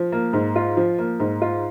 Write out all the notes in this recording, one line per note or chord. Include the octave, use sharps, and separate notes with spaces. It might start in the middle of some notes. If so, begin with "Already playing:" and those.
Already playing: F3
A#3
G#2
F4
F3
A#3
G#2
F4